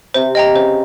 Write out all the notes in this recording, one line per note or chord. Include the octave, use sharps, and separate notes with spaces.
C3 C5
D#5 G5 A#5
C#3 C5